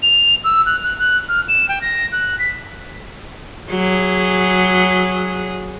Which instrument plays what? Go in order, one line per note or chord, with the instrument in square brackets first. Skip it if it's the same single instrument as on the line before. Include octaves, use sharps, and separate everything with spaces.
[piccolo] F7
E6
F#6
F#6
F#6
F6
E7
G5
A#6
F#6
B6
[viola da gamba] F#3 G#4